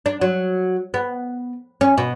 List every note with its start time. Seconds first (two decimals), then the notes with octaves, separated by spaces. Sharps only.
0.06 D4
0.21 F#3
0.94 B3
1.81 C#4
1.98 B2